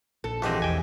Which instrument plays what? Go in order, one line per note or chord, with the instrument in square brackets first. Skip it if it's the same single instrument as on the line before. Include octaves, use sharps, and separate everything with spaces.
[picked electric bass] A#1 [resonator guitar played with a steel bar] A4
[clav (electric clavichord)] G#1 C4 [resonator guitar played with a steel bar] F2 D#5 [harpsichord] E3 G4
[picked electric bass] E1 [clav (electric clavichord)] G5 G#5